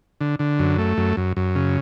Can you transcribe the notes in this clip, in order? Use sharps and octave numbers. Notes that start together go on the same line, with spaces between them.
D3
D3
F#2
A3
F#2
F#2
F#2
C#3